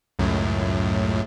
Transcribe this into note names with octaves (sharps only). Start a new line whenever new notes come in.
C#2 F#2 A2